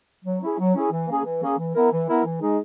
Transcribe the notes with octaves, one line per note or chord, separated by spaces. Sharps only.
F#3
C#4 E4 G#4
F#3
C#4 E4 G#4
E3
A#3 C#4 G#4
E3
A#3 C#4 G#4
E3
B3 E4 A#4
E3
B3 E4 A#4
E3
G#3 D#4 G#4